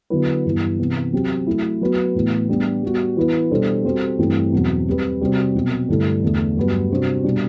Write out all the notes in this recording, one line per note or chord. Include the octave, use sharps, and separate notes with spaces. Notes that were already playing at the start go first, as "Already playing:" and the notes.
D3 F#3 B3 E4 B4
G2 E3 B3 E4
C3 E3 B3
F#3 C4 G4
F#3 A3 E4
F#3 B3 F#4 B4
A2 E3 B3
G3 B3 D4 G4
G3 B3 F#4
E3 B3 E4 B4
B2 G3 D4 A4 C5
G3 C4 F#4 A4 C5
G2 E3 A3 C4
E2 B2 F#3 C4
G3 C4 G4 B4
C3 G3 C4 F#4 C5
B2 F#3 C4 F#4
G2 D3 A3 E4 A4
E2 D3 A3
G2 F#3 B3 F#4 B4
C3 G3 D4 F#4 C5
B2 G3 D4